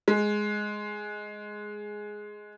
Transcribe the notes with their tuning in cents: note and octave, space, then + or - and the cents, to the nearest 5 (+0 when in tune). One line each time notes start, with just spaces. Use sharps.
G#3 +5